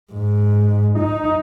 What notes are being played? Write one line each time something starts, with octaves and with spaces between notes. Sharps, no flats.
G#2
D#4